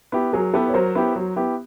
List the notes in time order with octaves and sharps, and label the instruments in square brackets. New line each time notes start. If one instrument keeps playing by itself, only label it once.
[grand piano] B3 E4 G4
[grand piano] F#3 [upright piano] G#4 A#4
[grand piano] B3 E4 G4 [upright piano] A4 B4
[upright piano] C#5
[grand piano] F#3 [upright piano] A#4 C5
[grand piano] B3 E4 G4
F#3
B3 E4 G4